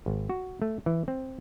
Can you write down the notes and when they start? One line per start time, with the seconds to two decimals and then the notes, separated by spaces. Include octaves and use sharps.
0.06 G#1
0.30 F#4
0.62 A3
0.86 E3
1.08 C4